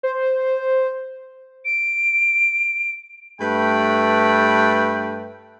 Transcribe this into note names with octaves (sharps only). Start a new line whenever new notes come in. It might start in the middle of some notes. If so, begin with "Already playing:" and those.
C5
D7
G2 A3 B4 G5 B5